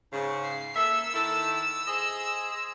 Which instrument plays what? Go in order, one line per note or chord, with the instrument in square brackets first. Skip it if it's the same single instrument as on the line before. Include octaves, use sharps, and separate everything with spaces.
[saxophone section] G#2 C#3
[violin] C7
[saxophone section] A#3 A4 E5 [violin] E6
[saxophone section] D#3 E4 A4
G#4 C5 D#5